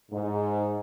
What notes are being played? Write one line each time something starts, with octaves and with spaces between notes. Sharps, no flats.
G#2